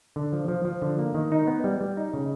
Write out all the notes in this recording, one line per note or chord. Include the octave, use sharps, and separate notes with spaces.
D3
F3
F3
F3
D3
A#3
D#3
D#4
B3
G3
G3
D#4
C#3